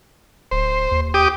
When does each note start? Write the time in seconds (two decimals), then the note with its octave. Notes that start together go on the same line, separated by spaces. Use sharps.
0.51 D1 C5
0.91 D#2
1.14 G4 D6 D#6